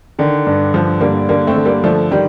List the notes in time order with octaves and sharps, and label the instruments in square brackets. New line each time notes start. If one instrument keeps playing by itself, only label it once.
[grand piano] D3 [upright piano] D#3
[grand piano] G2
[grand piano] D3 [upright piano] F3
[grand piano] D3 [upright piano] G3 A#3
[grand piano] D3 [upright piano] G3 A#3
[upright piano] A3 C4
[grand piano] D3
[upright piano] G3 A#3
[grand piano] D3 [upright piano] F3 A3
[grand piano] D3 [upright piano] D#3 G3